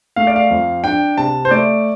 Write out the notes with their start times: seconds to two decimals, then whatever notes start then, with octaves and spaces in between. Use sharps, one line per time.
0.16 A3 F5
0.27 D5
0.36 F5
0.51 F2
0.84 D4 G5
1.17 C3 A5
1.45 C5
1.51 A3 D5